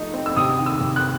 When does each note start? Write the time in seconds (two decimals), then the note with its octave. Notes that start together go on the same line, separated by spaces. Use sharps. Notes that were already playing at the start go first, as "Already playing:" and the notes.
Already playing: F3 A3 D#4
0.14 C4
0.26 E6
0.37 C3 D#6
0.59 D#3
0.66 E6
0.81 C3
0.96 F#6